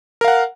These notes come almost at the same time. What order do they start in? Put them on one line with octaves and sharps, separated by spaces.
A#4 F5 F#5